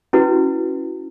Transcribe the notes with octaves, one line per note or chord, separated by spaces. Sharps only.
C#4 E4 F#4 B4